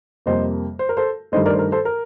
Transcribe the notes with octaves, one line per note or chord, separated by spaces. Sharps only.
F2 C3 G3 A#3 C5 D#5
C5
A#4
A4 C5
G2 D#3 A3 C5 D#5
A#4 D5
C5
A#4
A4 C5
A#4